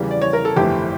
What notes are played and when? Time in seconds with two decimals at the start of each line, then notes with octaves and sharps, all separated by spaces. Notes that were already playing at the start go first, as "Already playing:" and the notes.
Already playing: E2 C#3 E3 G3
0.11 D5
0.22 C#5
0.33 A#4
0.45 A4
0.56 G1 F2 E3 A3 G4